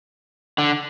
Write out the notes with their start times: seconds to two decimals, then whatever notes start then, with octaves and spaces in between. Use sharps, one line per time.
0.58 D3